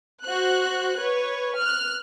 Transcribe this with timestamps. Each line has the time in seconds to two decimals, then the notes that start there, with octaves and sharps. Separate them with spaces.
0.22 F#4 C5 F#6
0.98 B4 C#5
1.56 F6 F#6